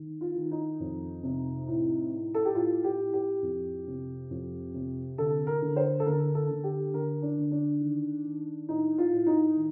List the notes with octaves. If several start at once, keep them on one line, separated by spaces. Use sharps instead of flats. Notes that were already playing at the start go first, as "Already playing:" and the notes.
Already playing: D#3
F4
D#3
D#4
F2
C3
A2
A2
A4
G4
A2 F4
G4
A2
G4
F2
C3
F2
C3
D3 A4
A#4
D3
C5
A4
D3 A#4
A4
D3
G4
D3 A#4
D4
D3
D4
D#3
D#3
A2 D#4
F4
A2
D#4
D#3